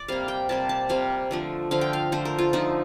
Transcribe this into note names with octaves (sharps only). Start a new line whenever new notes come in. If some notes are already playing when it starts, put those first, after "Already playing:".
Already playing: D5
C3 G3 A#3 F5
G5
C3 G3 A#3 A5
A5
C3 G3 A#3 F5
D3 F3 A3
D3 F3 A3 F5
G5
F5
D3 F3 A3 C5
A#4
F4
D3 F3 A3 D#4